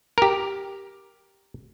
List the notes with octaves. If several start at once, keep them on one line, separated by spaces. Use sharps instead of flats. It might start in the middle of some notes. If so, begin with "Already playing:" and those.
G4 A#4